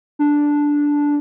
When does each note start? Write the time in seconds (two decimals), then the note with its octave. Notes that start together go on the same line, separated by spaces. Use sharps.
0.19 D4